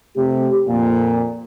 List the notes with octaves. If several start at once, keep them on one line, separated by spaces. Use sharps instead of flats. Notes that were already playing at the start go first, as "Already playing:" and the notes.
C3 A3 G4
F2 A#2